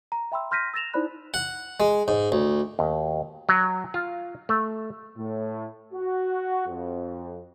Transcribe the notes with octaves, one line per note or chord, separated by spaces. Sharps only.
A#5
E5 G5 B5 C6 E6
C6 F6 G6 A#6 B6 D#7
E6 A6 A#6 E7 F7
D#4 E4 C5 D5 B5 F#6
F#5
G#3
G#2
D2
D#2
F#3
F4
A3
A2
F#4
F2